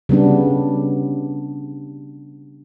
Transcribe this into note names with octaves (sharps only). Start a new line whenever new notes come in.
C#3 G3 B3 D4